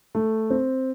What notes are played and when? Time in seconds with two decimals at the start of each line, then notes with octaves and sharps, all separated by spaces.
0.15 A3
0.50 C4